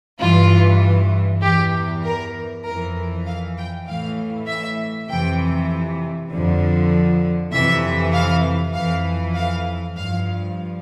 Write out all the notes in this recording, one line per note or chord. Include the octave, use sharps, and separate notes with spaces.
G2 E3 F4
E2 E3 G4
A#4
F2 E3 A#4
F5
G5
A2 E3 F5
E5
F2 C3 E3 G5
F2 D3 F3
F2 C3 E3 E5
F5
F2 E3 F5
F5
G2 F3 F5